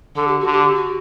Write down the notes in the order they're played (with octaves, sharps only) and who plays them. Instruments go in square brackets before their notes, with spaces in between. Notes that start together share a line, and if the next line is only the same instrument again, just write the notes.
[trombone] D3 [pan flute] A4
[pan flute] G4
F#4
[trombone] D3
[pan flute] G4
F#4